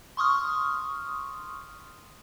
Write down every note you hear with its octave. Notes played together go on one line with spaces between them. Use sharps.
C6 C#6 D#6 F6